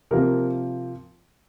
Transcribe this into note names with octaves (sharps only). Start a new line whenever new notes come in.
C3 F3 A#3 A#4